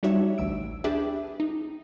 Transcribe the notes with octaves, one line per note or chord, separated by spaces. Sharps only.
G3 D4 D#4 F#4 C#5 E5
A1 D2 E6 D7
D4 G4 G#4 B4 E5
D#4